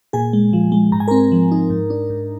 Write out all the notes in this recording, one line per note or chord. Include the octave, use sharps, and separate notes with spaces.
A#2 G#4 G#5
G#3
F3
G#3
G#2 A#5
G#5
C4 A#4 A#5
F3
D#4
G#2
D4
G#2